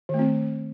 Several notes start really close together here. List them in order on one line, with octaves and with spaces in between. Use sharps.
D#3 A3 C4